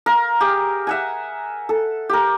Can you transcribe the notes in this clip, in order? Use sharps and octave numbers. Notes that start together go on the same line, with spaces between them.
A#4 F5
G4 G#4
E5 F#5 G#5
A4
G4 A#4